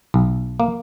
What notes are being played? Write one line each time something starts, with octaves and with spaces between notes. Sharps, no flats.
B1
A#3